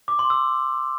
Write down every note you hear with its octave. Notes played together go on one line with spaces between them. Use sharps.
D6
C6
E6